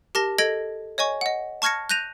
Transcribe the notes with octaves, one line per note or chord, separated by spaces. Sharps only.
G4 A#4 A5 A#6
A4 D#5 G#6 A#6 D7 F#7
C#5 D#5 G#5 C#6
D#5 F#5
A5 C#6 F6 G#6 A#6 C#7
F#6 G6 A#6 D#7 F7